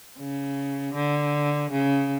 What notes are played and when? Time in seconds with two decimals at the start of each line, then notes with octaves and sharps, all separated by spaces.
0.19 C#3
0.94 D3
1.71 C#3